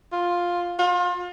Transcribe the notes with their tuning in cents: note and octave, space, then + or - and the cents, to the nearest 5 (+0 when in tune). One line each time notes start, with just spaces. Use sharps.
F4 +5
F4 +30